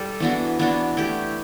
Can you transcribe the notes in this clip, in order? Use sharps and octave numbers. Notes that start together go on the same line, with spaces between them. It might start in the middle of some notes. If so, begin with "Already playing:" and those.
Already playing: G3 A4
E3 B3 D4 F#4
E3 B3 D4 F#4
A3 E4 G4